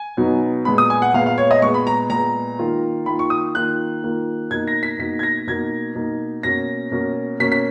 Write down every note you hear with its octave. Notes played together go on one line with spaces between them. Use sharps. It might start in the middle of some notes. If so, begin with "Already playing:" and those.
Already playing: G#5
B2 F#3 B3 D#4
A#2 G#3 B3 B5
D#6
G#5
F#5
A#2 G#3 B3 F5
F5
C#5
D#5
A#2 G#3 B3 C#6
B5
A#5
A#2 G#3 B3 A#5
D#3 A#3 F4
D#3 A#3 F4 B5
C#6
D#6
D#3 A#3 F4 F#6
D#3 A#3 F4
B2 A#3 D#4 G#6
A#6
B6
B2 A#3 D#4 B6
G#6
A#6
B2 A#3 D#4 G#6
B2 A#3 D#4
B2 A#3 C#4 A#6
B2 A#3 C#4
B2 A#3 C#4 B6
B6